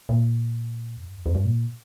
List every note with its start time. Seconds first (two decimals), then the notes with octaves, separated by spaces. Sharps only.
0.09 A#2
0.96 F2
1.05 G2
1.15 F2
1.26 F2
1.35 G2
1.45 A#2